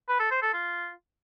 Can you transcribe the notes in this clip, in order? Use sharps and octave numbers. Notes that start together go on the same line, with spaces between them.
B4
A4
C5
A4
F4